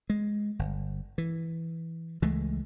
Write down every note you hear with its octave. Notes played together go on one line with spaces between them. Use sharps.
G#3
G1
E3
C#2 E3 G#3 A3